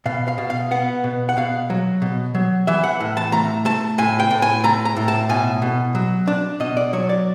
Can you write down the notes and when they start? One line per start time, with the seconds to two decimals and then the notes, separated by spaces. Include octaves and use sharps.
0.06 B2 F5
0.28 F5
0.38 B2
0.50 F5
0.71 B3 F#5
1.04 B2
1.29 F#5
1.37 B2 F5
1.70 F#3
2.02 B2
2.35 F#3
2.67 E3 E5
2.84 F#5
3.00 A2
3.17 A5
3.32 A3 A#5
3.65 A3 A5
3.98 A2 G#5
4.20 G5
4.31 A2
4.42 G#5
4.64 A3 A#5
4.85 A#5
4.97 A2
5.08 A5
5.29 B2 G#5
5.62 B2
5.95 F#3
6.28 D4
6.60 B2 D#5
6.77 D5
6.93 F#3 C#5
7.09 D5